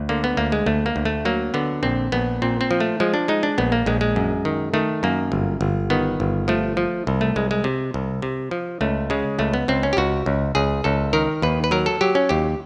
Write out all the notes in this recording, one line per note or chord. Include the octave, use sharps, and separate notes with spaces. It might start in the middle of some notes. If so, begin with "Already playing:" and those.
Already playing: D2
D3 A#3
B3
D2 A#3
G#3
D2 A3
A#3
D2
A3
F#3 A#3
D3 B3
A#1 C4
A#1 B3
A#2 C4
C4
F3
A3
F3 G#3
D4
G#3 D#4
D4
A#1 B3
A#3
A#1 G#3
G#3
F#2
D#3
D#3 A3
F#2 A#3
G1
G1
D#3 B3
G1
F3 A3
F3
C2
A3
C2 G#3
G#3
C3
C2
C3
F3
C#2 A3
C#3 G#3
C#2 A3
B3
C#2 C4
C#4
G4
C#2 F#4
C#2
C#2 G#4
C#2 A4
D#3 A#4
D#2 B4
B4
F#3 A#4
A4
F#3 G4
C#4
D#2 G4